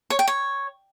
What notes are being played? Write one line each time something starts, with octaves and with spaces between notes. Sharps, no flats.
C#5
G5
C#5